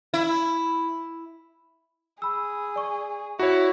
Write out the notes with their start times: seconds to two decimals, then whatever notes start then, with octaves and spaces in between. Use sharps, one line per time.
0.14 E4
2.22 G#4 B5 E6
2.76 D5 C#6
3.39 E4 F#4 C#5